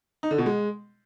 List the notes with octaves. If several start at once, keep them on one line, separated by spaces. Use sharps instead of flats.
D#4
D3
B2
G#3